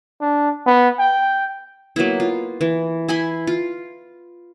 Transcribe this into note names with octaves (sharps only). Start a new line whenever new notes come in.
D4
B3
G5
F#3 A#3 B3 E4
F4
E3
E4 G#5 B5 C6
F4